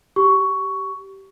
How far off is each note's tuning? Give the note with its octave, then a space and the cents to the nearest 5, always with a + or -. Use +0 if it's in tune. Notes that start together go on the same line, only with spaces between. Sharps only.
G4 -15 C#6 +10